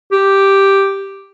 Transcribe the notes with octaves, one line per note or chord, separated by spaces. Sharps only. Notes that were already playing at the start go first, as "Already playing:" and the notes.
G4